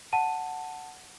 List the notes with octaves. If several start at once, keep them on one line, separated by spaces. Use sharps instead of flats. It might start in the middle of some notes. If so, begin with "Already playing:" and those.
F#5 A5 D#7